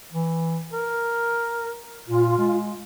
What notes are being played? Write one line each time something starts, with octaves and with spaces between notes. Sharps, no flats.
E3
A#4
A#2 F4
G#3